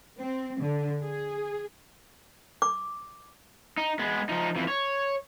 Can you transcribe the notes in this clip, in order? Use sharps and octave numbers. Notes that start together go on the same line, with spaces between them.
C4
D3
G#4
D6
D#4
G#3 B3
F3 D#4
F2 E3
C#5